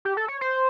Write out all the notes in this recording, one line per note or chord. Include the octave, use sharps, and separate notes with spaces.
G4
A4
C#5
C5